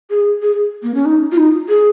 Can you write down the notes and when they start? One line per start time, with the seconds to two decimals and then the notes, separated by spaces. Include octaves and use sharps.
0.10 G#4
0.42 G#4
0.83 A#3
0.95 C#4
1.05 D#4
1.32 F4
1.37 D#4
1.69 G#4